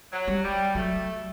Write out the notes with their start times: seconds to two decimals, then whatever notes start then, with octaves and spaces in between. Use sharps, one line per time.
0.13 F#3
0.28 G3
0.43 G3
0.75 F#3 A3